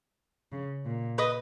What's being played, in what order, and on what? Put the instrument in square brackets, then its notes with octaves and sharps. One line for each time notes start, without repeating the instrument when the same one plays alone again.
[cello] C#3
A#2
[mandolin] B4 D#5